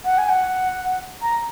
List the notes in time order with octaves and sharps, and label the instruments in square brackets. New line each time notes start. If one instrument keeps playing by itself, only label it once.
[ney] F#5
G#5
F#5
A#5